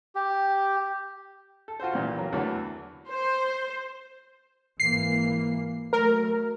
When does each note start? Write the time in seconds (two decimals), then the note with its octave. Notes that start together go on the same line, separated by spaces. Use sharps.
0.15 G4
1.68 A4
1.80 F4 F#4 A4 C5
1.93 C2 A#2 E3
2.18 F#3 A#3
2.33 E2 D3 E3 F#3 A3
3.10 C5
4.80 G#1 E3 A#3 C7
5.93 F#3 A3 A#4